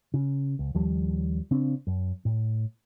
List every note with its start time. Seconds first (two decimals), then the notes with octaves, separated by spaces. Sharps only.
0.14 C#3
0.59 C#2
0.75 D#2 F3 G3
1.51 C#3 C4 D4
1.87 F#2
2.25 A2